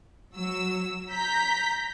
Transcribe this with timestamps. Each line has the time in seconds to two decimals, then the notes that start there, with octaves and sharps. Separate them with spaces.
0.34 F#3 E6
1.12 A#5 G6 B6